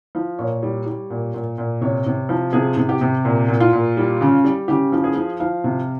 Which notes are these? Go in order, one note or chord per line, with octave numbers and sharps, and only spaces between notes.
F3
A#2 C#5
G3
G3
A#2
A#2
A#2
C3 C#5
C3
F3
C3 G#4
C3
G4
C3
A#2
A#2
F4
A#2
G3
C#3
G3
C#3 G4
F3
G#4
F3
F3 F5
C3